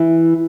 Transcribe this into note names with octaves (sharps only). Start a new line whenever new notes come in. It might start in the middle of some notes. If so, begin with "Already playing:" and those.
Already playing: E3